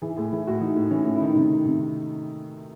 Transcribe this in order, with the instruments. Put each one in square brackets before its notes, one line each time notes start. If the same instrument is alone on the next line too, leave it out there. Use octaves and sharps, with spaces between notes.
[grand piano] E3 G#4
A2 G#4
E3 G#4
A2 F#4
E3 D#4
A2
E3 C#4
A2
E4
D#3 D#4
C3
D#3
C3